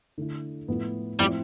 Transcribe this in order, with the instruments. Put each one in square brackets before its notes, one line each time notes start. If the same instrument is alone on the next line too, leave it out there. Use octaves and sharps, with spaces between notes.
[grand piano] D3 A3 E4
A2 F3 B3 E4
[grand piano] A2 F3 C4 E4 [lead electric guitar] G3